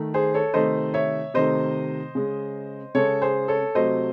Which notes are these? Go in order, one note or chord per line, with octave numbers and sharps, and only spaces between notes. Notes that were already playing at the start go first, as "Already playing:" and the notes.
Already playing: D#3 A3
G#4 C5
A4 C#5
C3 D#3 A3 C5 D#5
C#5 E5
C3 D#3 A3 C5 D#5
C#3 G#3
C#3 G#3 A4 C#5
G#4 C5
A4 C#5
C3 F#3 A3 C5 D#5